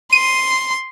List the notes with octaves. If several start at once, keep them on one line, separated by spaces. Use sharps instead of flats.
C6 D#7